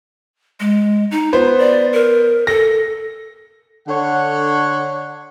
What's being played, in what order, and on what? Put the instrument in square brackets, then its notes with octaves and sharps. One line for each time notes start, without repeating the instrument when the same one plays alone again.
[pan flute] G#3
D#4
[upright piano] B3 C5 [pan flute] F4
[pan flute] D5
A#4
[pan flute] A4 [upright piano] A#6
[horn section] D3 C#5 F#5